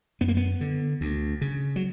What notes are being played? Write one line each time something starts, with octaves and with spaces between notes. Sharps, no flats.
F#2 B3
A#3
B3
D3
D2
C#3
F#3